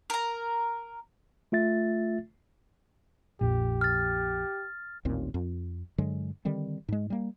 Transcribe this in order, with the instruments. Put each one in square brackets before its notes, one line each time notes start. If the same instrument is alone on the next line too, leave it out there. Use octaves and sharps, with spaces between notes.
[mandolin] A#4 A#5
[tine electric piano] A3 F4 E5 A6
[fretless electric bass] A#1 F2 A#2 [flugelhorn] G4
[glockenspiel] F6 A6
[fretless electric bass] A1 D#2 A#2 C4
F2
G2 D3 F#3 G#3
D3 D#3 G3 C4
G#2 G#3
G3 A#3